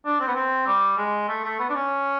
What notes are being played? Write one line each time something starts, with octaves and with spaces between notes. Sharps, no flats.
D4
C4
B3
C4
G3
G#3
A3
A3
B3
D4
C#4